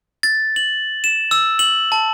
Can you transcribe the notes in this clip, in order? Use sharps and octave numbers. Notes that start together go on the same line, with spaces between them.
A6
F#7
E7
E6
F#7
A5